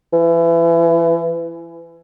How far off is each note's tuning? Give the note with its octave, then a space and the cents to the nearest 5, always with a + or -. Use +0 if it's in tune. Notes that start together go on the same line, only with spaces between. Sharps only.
E3 +25